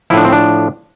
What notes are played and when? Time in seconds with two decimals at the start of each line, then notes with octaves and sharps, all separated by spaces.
0.10 F3 E4
0.13 A2 D4
0.25 C4
0.32 D4